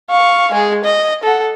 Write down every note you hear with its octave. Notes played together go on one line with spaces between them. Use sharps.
F5 C#6
G#3 G#4
D#5
A4 F#5